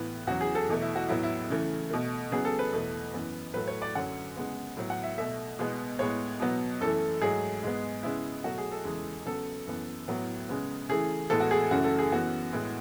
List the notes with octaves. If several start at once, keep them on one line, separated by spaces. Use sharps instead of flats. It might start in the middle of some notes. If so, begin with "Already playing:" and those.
Already playing: A2 E3 B3 B4
E2 C#3 F#3 F#4
G#4
A4
E2 B2 A3
E4
F#4
A2 F#3 B3 E4
E4
C#3 E3 A3
B2 A3
C#3 F#3 B3 G#4
A4
B4
E2 B2 A3
F#2 E3 B3
A2 F#3 A3 B4
C#5
D5
F#2 D3 F#3 F#5
C#3 G#3 B3
A2 F#3 B3
F#5
E5
B2 A3 E5
B2 G#3 B3
A2 G#3 B3 C#5
B2 F#3 B3
F#2 E3 A3 A4
G#2 F#3 A3 G#4
G#2 G#3 B3
C#3 G#3 B3 E4
B2 F#3 A3 F#4
G#4
A4
E2 C#3 G#3
C#3 F#3 B3 A4
F#2 E3 B3
A2 F#3 B3
C#3 G#3 B3
C#3 E3 A3 G#4
A2 E3 G#3 B3 A4
F#4
G#4
F#2 C#3 E3 A3 F#4
A4
G#4
F#2 E3 B3 F#4
A2 G#3 B3